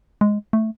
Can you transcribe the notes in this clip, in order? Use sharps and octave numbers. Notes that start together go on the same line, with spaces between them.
G#3
A3